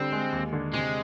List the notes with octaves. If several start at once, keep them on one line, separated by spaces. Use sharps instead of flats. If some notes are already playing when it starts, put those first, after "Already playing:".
Already playing: D3 G3 C4
G#3
D#2
D3
C3 G#3